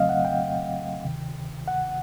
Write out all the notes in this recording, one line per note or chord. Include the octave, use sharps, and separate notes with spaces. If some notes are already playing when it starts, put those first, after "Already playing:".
Already playing: F2 C#3 F#3 A3 C4 D#5 F5
F#5
G5
D2 C3 D#3
F#5